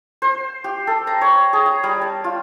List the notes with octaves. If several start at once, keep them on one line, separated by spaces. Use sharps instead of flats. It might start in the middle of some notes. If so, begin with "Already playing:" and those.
C5
G4
A4
A#5
C#5
G#4
A#5
G3
A5
F4